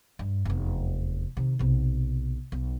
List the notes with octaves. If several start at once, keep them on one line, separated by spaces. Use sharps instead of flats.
G2
F1 E2
C3 D#3
B1 C3
B1